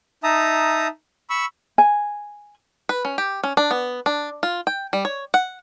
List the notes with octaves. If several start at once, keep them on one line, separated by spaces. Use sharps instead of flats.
D#4 E5 A5 A#5 D#6
B5 C#6 E6
G#5
B4
C#4
G4
C#4
D4
B3
D4
F4
G5
G3
C#5
F#5